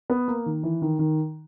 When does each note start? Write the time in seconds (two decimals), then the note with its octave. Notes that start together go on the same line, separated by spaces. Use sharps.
0.10 B3
0.28 A#3
0.46 D#3
0.63 E3
0.82 D#3
0.99 D#3